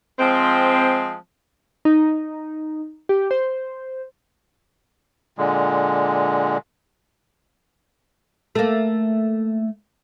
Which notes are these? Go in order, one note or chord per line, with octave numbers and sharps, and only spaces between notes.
F3 G#3 C4
D#4
G4
C5
A#2 D3 G#3
A3 A#3